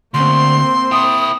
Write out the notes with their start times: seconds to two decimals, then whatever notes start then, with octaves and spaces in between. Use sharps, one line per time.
0.14 D2 A#3 C4 C6
0.91 E4 G5 D#6